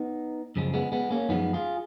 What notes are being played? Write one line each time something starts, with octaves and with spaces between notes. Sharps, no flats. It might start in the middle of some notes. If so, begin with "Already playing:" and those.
Already playing: B3 D#4
F#2 C#3 F3 G#3
G#3 B3
G#3 B3
A#3 C#4
F#2 F3 G#3 B3 D#4
F4 G#4